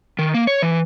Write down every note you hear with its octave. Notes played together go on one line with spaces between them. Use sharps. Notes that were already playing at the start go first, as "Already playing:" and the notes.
D#3
A#3
C#5
E3